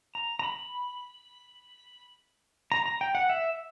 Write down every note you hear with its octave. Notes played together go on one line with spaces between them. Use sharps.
A#5
A#5
B5
A#5
A#5
G5
F#5
E5